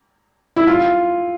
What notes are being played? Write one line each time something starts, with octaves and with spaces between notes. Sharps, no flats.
E4
F4